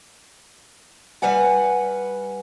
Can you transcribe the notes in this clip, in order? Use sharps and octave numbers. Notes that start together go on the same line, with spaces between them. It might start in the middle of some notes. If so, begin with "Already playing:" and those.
G3 B4 F#5 G#5